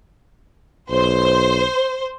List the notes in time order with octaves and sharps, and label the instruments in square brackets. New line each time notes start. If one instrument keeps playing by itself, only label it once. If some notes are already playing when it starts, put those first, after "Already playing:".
[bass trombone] B1 [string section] C5